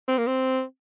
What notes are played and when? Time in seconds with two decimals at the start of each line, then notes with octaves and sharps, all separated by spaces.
0.08 C4
0.18 A#3
0.27 C4